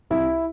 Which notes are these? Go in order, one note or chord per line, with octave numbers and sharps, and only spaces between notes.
C2 E4